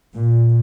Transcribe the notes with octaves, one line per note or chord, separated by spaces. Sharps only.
A#2